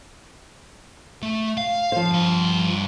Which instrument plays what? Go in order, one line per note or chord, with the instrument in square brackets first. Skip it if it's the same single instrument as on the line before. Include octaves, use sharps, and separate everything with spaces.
[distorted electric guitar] A3
F5
[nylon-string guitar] F3 C5
[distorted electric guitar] G2 C6